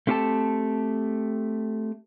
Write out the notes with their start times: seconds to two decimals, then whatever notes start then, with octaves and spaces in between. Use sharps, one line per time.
0.07 A3 C4 F4 G4 A4 A5